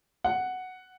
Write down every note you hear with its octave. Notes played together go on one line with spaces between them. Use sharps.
F#5